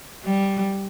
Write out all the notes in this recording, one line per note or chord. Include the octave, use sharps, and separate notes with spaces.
G3